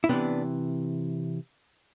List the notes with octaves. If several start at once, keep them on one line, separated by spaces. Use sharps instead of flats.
E4
C3 E3 B3 D4